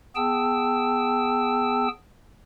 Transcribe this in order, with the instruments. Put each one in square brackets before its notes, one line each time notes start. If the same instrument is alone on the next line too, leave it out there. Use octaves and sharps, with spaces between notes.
[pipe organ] B3 G#4 G5 A5 E6